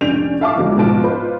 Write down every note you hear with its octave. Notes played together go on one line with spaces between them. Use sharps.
F1 C#4 D4 G6 D7 F7
E5 F5 A5 C#6 D6
E2 D3 F3 F#3 G#3
G#2 B2 F3 F4 A5 D7
F4 B4 C5